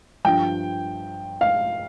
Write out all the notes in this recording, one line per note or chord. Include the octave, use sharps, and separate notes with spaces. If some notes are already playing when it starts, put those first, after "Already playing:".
G2 F3 G5
F5